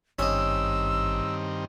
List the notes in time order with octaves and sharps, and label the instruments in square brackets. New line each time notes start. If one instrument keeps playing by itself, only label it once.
[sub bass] G#1 [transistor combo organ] G2 D#3 C4 [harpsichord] C#4 D#5 [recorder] E6